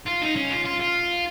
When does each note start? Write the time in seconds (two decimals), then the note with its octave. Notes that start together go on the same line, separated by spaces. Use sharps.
0.06 F4
0.21 D#4
0.36 C#4
0.50 F4
0.65 F4
0.80 F4